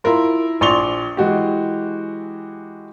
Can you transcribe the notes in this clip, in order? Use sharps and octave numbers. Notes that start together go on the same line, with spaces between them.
E4 F4 A#4 C6
A#1 D5 C6 C#6 F7 G7
E3 G#3 F#4 G4